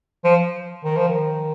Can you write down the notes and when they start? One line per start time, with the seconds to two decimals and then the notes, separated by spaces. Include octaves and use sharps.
0.24 F3
0.84 D#3
0.96 F3
1.08 D#3